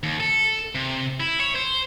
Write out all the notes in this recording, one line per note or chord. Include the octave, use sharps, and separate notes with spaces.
D#2
A4
C3
E4
C#5
C5